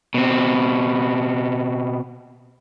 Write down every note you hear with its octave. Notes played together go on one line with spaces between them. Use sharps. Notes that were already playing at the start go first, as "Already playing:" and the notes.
B2 C4